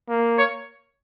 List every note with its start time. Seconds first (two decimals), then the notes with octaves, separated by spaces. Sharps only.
0.09 A#3
0.39 C#5